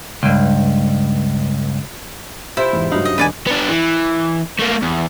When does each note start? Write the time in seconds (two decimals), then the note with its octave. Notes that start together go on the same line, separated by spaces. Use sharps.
0.23 C#2 G2
2.57 C3 E4 F4 C5
2.73 E2 G#2
2.91 G2 C#3 F#3 D#4 F5 F#5
3.05 D#5
3.18 E1 D4 B4 D5 G#5
3.47 B3 D4
3.69 E3
4.59 A3 A#3
4.82 E2